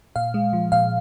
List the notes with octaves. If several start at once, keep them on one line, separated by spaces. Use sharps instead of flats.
A#2 F5
G#3
F3
A#2 F5